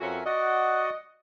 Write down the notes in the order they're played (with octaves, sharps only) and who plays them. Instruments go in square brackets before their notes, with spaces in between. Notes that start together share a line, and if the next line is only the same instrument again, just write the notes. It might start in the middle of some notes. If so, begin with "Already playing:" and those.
[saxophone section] F2 C#4 F#4 [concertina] A#4 E5 G#5
[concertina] F#4 D5 F#5 [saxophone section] D#5